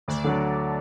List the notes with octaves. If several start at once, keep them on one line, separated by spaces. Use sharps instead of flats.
D2 D4 D5
D3 F#3